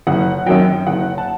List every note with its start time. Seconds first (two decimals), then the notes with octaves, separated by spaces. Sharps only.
0.07 F#1 F#5
0.46 F#2 D#3 F#3 G5
0.87 F#1 F#5
1.18 A5